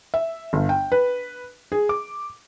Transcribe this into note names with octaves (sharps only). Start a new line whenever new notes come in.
E5
G1
G5
B4
G#4
D6